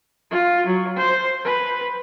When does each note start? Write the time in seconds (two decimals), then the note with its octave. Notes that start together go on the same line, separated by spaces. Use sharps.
0.31 F4
0.66 F#3
0.97 C5
1.45 B4